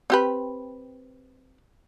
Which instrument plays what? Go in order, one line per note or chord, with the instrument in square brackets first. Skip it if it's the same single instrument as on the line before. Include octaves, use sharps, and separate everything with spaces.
[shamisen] C4 G4 B4